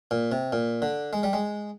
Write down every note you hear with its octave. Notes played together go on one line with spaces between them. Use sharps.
A#2
C3
A#2
D3
G#3
G3
G#3